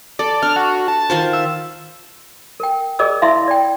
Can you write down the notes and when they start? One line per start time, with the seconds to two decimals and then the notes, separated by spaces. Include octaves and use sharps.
0.19 A4 D5
0.43 D4 F6
0.56 F#4
0.88 A5
1.10 D#3 F4 C5
1.33 E5
2.60 A#4 G5
2.99 G#4 A#4 D5 D#5 D6 E6
3.22 E4 E5 F5 B5 C6
3.48 D5 G5